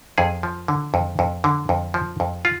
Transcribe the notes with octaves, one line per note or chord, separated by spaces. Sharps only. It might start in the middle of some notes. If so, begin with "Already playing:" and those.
F2 G#4
F3
D3
F2
F2
D3
F2
F3
F2
F4